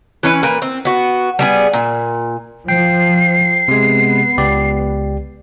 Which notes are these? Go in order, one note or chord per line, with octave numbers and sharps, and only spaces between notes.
E3 C#4 B4
A#2 A#3 B4
C4
B3 F#4
G3 B3 G#4
A#2
F3 G5 C7
C3 G#3 B3
C#2 G4 D5